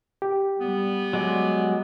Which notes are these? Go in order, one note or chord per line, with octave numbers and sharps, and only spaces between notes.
G4
G3 B3
F#3 G#3 D5